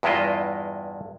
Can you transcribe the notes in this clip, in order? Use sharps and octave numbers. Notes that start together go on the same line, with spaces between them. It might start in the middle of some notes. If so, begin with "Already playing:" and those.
E2 G2 G#3 E4 F4 D#5